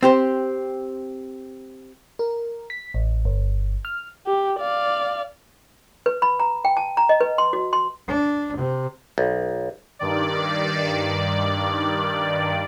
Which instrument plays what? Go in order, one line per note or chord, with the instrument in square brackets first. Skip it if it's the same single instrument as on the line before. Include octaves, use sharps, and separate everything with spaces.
[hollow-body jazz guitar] C4 G4 C5
[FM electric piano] A#4
B6
A1
G1
F6
[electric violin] G4
D5 F5
[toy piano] B4
B5
A#5
G5
A5
A#5
D#5
B4
C6
F#4
C6
[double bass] D4
C3
[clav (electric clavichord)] B1
[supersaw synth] G2 D#3 D5